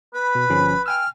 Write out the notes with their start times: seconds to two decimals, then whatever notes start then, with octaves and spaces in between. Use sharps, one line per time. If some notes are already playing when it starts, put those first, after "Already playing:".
0.14 B4 B5
0.35 B2
0.50 G1 F3 C#4
0.86 G5 G#5 E6 F6